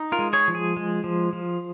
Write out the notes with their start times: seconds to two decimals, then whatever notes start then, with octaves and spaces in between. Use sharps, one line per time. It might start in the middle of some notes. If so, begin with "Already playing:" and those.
Already playing: D#4
0.12 F4 A#4
0.19 G#3
0.33 G#4 C#5
0.48 F3
0.55 G#4
0.77 G#3
1.04 F3
1.33 F3